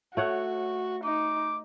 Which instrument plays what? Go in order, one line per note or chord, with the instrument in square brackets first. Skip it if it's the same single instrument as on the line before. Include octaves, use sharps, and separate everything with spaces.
[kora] A3 C#5 F#5 [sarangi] F#4
[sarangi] D#4 [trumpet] D6